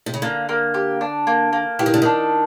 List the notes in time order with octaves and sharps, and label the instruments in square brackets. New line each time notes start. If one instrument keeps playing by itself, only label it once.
[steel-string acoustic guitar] C3
C#3
[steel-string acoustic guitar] D3 [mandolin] A#3
[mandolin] A#3
G4
D4
A#3
A#3
[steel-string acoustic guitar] E3 [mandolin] G4
[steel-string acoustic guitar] D#3
D3
[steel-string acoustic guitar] D#3 [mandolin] D4